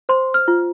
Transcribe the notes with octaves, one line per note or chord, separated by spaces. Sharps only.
C5 C6
F6
F4